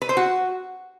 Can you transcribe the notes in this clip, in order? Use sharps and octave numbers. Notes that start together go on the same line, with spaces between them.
B4
C5
F#4